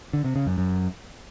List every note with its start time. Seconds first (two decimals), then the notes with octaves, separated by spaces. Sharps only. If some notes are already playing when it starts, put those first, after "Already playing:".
0.13 D3
0.25 C3
0.36 C#3
0.47 F#2
0.58 F#2